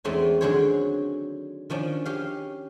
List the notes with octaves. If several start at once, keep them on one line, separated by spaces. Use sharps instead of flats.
E2 G#3 A3 C4 C#4 D#4
D3 D#3 F#3 G#4 C5 C#5
D#3 F3 C#4 D4
C#4 G4 F5